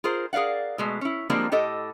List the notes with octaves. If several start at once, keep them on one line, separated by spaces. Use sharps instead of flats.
F4 G#4 A#4 C5
G#4 A#4 D5 F5 F#5
B2 G#3 A3
C#4 E4
F3 G3 G#3 A#3 C4 D4
A2 G4 A4 D#5